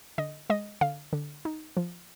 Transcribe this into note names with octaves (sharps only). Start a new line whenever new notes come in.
D3 D#5
G#3 D#5
D3 F5
D3
D#4
F3